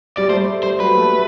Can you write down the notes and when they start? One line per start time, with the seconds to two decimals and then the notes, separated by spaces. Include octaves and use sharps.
0.17 G3 D5
0.29 A3 C5
0.63 G3 C5
0.80 F#3 B4
0.97 A3